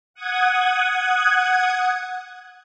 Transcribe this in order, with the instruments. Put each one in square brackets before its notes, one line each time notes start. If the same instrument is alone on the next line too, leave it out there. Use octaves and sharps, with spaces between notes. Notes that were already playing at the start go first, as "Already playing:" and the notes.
[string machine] F#5 D#6 G#6